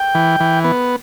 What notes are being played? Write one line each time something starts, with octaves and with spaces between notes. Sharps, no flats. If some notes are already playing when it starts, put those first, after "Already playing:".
Already playing: G5
E3
E3
B3